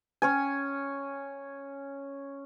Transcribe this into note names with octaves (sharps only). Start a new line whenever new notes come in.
C#4 C#5 G#5